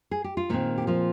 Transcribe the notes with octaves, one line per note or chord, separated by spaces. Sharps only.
G#4
G4
F4
A#2 D#3 G#3 C4 D#4
G4
F3 F4